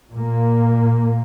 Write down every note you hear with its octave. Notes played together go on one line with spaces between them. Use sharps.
A#2 A#3